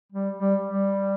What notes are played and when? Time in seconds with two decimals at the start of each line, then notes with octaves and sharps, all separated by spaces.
0.12 G3
0.38 G3
0.64 G3